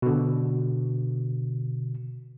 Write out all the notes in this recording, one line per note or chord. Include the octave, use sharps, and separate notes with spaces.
B2 D3